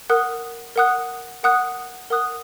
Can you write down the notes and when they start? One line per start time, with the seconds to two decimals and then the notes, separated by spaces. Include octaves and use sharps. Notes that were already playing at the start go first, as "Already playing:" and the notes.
0.10 A#4 F#5 D#6 F#6
0.76 A#4 F#5 D#6 F#6
1.43 A#4 F#5 D#6 F#6
2.10 A#4 F#5 D#6 F#6